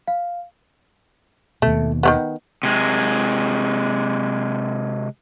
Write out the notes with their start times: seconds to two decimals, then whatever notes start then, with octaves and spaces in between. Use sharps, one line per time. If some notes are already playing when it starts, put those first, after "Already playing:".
0.08 F5
1.62 D#2 B2 A3
2.03 D#3 A3 B3
2.63 C3 G#3